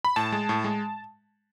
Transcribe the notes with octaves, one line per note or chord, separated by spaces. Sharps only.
B5
A2 A5
G#3
A2
G#3